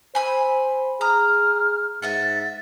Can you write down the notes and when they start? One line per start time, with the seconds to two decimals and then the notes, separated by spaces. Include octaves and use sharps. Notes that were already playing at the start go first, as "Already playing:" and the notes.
0.15 C5 G#5 B5 E6
1.01 G#4 A#5 D#6 F6
2.02 G#2 D#5 E5 F#5 A6